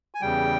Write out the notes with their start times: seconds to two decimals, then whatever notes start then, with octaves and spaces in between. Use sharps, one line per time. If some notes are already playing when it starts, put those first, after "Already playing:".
0.15 G#5
0.21 E2 C#3 G3 G5